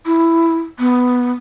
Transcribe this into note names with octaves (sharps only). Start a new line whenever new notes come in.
E4
B3